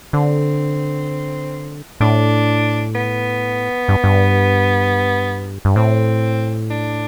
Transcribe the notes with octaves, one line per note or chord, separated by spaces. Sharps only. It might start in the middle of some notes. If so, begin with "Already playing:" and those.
D3 C4
A2 D4
B3
G2
G2
G2
A2 C4
D4